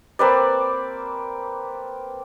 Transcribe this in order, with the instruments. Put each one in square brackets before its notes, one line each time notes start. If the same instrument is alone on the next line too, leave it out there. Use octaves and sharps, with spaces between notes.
[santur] A#3 C4 B4 D5